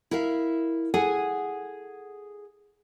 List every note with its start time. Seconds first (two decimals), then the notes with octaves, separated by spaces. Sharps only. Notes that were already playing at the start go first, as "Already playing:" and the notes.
0.11 E4 A#4 E5 F5
0.94 G#4 A4 F#5 G#5